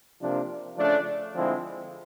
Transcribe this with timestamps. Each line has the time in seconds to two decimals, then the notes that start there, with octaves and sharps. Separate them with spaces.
0.20 C3 F3 A#3 D4
0.77 C#3 F3 A3 D4
1.34 D3 F3 G#3 C4 E4